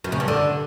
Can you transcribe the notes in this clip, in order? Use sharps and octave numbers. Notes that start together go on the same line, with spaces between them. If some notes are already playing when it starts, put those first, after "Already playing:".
F#2
C#3
G2
D3